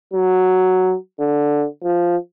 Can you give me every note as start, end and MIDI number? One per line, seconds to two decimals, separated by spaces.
0.13 0.95 54
1.19 1.66 50
1.84 2.16 53